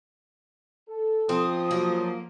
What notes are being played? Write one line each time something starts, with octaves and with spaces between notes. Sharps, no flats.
A4
F3 C4 D#6
F#3 A#3